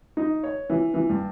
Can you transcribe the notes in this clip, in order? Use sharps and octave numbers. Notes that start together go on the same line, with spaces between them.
D#4
C#5
E3
E3
G2